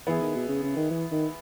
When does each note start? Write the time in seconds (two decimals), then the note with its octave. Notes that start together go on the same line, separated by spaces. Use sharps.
0.07 E3 B3 E4 G#4
0.22 D#3
0.35 B2
0.49 C#3
0.63 C#3
0.76 D#3
0.90 E3
1.11 D#3